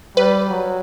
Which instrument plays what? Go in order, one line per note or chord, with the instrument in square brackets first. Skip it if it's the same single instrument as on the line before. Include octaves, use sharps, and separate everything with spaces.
[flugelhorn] G3 [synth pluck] B4
[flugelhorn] F#3